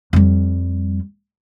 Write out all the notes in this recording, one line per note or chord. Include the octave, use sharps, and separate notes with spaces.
F2 G3